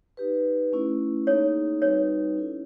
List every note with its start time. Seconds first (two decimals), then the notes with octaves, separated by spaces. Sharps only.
0.17 D#4 G4 B4
0.73 A3 C#4 E4
1.27 A#3 D#4 G#4 C#5
1.81 G3 C4 D#4 F#4 B4 C#5
2.36 C#4 E4 A4